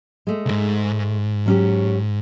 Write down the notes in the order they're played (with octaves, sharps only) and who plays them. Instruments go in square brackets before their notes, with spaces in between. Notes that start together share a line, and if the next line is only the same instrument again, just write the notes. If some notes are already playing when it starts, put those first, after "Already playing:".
[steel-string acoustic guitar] G#3 A3
[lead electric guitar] C2 G#2
[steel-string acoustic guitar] F#3 C#4 G4